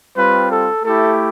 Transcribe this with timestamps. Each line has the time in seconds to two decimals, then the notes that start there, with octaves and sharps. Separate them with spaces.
0.16 G3 C4 F4 B4
0.50 A4
0.83 A3 E4 G4 A4